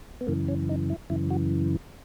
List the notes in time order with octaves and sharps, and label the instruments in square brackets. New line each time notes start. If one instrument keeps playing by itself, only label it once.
[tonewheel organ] B3
F#2 C#3 E3 A#3
C#4
D#4
E4
F#2 C#3 E3 E4
F#4